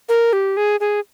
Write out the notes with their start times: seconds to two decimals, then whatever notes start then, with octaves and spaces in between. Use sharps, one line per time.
0.09 A#4
0.33 G4
0.57 G#4
0.80 G#4